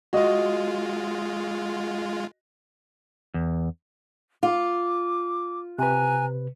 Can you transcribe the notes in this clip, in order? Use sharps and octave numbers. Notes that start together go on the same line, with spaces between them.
G#3 F4 F#4 D#5
E2
F4 D6
C3 B4 G#5 A#5 F#6